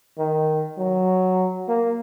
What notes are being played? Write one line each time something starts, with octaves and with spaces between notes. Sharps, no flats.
D#3
F#3
A#3